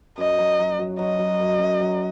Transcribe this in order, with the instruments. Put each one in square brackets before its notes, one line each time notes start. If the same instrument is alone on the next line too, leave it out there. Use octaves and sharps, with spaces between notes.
[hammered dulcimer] F#2 [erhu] D#5
[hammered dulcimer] F#3
F#3
F#3
[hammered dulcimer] F#3 [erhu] D#5
[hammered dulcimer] F#3
F#2
F#2
F#3